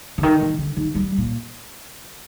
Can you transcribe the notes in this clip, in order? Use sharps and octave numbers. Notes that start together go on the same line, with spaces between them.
D3
D#3
D#3
D3
D#3
G3
A#2